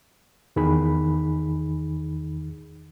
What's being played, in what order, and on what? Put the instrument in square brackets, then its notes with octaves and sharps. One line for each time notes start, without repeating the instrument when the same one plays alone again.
[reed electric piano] E2 D#3 D#4 G#4 B5